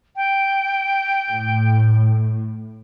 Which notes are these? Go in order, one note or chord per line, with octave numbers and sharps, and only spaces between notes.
G5
A2